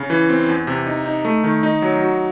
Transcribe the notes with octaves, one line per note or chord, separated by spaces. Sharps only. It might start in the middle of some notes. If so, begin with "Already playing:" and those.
Already playing: C#3
E3
C4
E2
C3
D#4
D#4
A3
D#3
D#4
F#3
F#4